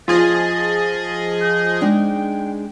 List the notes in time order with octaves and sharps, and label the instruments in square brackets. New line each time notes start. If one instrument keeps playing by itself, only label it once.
[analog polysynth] F3 G#4 D#5 [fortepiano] F4 [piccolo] A6
[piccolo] G6
[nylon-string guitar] G#3 D4 D#4 [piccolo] G5